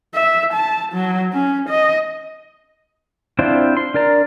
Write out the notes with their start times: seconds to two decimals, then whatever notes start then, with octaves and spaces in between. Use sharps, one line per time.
0.14 E5
0.53 A5
0.93 F#3
1.33 C#4
1.69 D#5
3.39 C4 D4 E4 F4 C5
3.77 C6
3.94 D4 A#4 D5 A#5